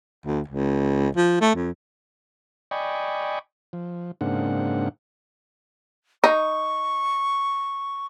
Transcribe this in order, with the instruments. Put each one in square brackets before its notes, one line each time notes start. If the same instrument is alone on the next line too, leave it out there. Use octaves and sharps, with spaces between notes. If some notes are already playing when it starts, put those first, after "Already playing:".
[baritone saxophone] D2
C#2
F3
A3
F2
[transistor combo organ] D5 D#5 G5 G#5 B5 C#6
F3
G#2 C#3 A#3 C4 D4 F#5
[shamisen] D#4 [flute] C#6